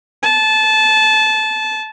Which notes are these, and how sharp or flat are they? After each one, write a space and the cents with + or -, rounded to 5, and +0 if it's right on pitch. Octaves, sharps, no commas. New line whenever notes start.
A5 -20